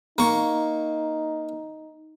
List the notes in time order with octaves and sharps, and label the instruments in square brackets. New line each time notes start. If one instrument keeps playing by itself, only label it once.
[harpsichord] A#3 C#6 [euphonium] D#4